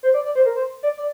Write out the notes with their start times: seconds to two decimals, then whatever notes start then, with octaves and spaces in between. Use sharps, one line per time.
0.03 C5
0.14 D5
0.25 D5
0.35 C5
0.46 A#4
0.56 C5
0.83 D5
0.98 D5